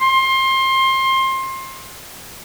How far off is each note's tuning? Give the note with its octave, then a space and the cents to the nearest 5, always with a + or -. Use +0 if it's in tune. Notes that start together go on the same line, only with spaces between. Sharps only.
C6 +25